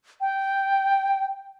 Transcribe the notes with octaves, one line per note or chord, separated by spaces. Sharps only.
G5